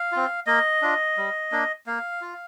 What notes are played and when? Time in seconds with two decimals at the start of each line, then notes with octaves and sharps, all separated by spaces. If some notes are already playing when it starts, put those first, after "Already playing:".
Already playing: F5
0.12 C4 F4
0.46 A#3 D#5
0.82 D4 F4
1.17 G3
1.52 A#3 D4
1.86 A#3 F5
2.22 F4